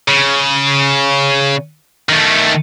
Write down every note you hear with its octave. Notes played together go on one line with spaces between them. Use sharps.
C#3
D#3 A3